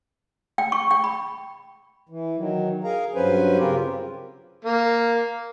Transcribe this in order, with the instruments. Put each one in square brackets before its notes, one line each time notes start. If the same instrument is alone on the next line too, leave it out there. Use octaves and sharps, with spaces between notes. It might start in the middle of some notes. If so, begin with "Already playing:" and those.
[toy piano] G5
C#6
G5
B5
[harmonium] E3
D#3 F#3
G#4 A#4 F5 A#5
G2 F#3 C#4 B4 C5 G#5
C#3 C4 F4 G4 A#4
[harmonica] A#3